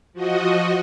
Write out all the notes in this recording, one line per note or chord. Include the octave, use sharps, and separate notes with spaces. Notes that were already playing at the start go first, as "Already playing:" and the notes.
F3 F#4 D#5